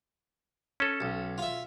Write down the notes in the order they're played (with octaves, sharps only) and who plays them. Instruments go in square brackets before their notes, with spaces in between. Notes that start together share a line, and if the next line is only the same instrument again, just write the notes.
[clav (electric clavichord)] C#4 A4
[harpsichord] B1
F4 E5